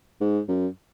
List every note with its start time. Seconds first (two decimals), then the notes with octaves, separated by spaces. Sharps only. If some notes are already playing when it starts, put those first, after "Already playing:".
0.20 G#2
0.48 F#2